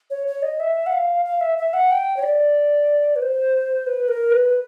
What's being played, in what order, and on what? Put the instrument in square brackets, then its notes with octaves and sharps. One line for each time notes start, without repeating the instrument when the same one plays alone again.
[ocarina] C#5
C#5
D#5
E5
F#5
F5
F5
E5
E5
F#5
G5
C#5
D5
B4
C5
B4
A#4
B4